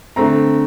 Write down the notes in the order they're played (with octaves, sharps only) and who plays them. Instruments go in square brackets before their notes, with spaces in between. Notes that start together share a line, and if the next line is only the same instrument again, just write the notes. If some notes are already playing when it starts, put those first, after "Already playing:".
[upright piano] D3 A3 C4 A#5